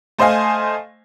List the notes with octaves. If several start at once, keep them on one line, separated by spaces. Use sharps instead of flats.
A3 C5 D#5 F5 G#5